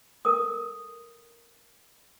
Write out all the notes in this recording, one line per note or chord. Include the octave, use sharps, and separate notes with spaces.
A4 A#4 D#6